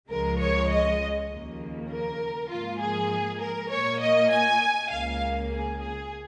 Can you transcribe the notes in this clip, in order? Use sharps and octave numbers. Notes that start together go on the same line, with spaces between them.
C#2 C#3 F3 G#3 A#4
C#5
D#5
D#2 C#3 F3 A#3
A#4
G#2 F3 A#3 F4
G#4
A#4
A#2 A#3 C#5
D#5
G#5
C#2 C#3 A#3 F5
G#4
G#4